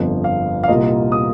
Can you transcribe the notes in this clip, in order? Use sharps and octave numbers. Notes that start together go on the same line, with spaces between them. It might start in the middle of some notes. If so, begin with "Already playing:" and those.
Already playing: G1 F2 F3
F5
F5
C2 A#2 A#3 F4 D#5
D#6